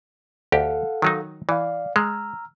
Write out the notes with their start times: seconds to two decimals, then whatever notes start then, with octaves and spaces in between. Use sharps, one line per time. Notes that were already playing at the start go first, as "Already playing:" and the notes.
0.52 D2 G4 A4 F5 F#5
1.02 D#3 F#3 D#4
1.49 E3 D5 F5
1.96 G#3 A#5 E6 F6